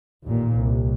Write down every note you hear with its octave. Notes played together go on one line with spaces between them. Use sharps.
A1 D#2 A#2
C2